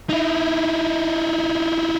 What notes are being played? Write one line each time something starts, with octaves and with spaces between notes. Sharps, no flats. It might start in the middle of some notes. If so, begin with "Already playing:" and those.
D#4 E4